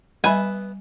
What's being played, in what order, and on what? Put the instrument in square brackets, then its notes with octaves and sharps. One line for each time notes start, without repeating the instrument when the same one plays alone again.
[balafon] G3 D#5 [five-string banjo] B3 B4 E5 [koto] G#5